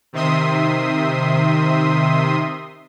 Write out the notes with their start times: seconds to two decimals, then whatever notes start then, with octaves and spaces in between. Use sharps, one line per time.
0.13 C3 D#3 C4 E5 C6 D#6